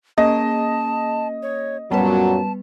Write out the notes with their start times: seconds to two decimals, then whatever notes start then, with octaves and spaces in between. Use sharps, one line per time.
0.18 A#3 C#4 G#4 D#5 A5
1.43 C#5
1.92 F#2 A#2 F#3 G3 B3 B4 A5